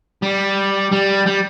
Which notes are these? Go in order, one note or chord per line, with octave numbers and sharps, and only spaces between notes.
G3
G3
G3